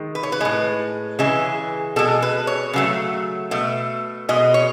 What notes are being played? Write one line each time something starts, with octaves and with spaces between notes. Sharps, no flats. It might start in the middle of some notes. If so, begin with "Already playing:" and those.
Already playing: D#3 G#3
B4
C#5
B4
A2 G#3
C#3 E3 G#3
B2 G#3 A4
B4
C#5
C#3 F#3 A3
B2 A3
B2 G#3 D#5
C#5